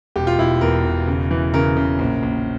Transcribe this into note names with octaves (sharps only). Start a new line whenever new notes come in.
E1 G4
F4
E1 E4
E2 A#4
E1
C#3
E3
C#3 A#4
C#3
A#1
A#1